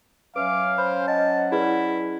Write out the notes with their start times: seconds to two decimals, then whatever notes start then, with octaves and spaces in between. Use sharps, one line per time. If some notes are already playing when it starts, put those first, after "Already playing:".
0.36 F#3 C#4 B4 E5 F5 D6
0.78 C5 B5
1.08 D#5 F#5 A5
1.52 E4 G#4 B4 D5